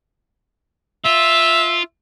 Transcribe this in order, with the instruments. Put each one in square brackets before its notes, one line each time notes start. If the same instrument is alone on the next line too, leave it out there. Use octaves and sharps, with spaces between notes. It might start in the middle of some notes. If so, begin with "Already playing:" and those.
[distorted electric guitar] F4 [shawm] E5